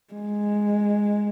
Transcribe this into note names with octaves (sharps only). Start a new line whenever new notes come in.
G#3